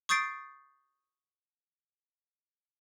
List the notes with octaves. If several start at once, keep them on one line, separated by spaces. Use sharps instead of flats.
C#6 D#6 G6 A6 C7 D7